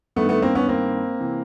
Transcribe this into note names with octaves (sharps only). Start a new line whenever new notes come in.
G2 D#3 A3 B3
A3 B3
A#3 C4
B3 C#4
A#3 C4
C3 E3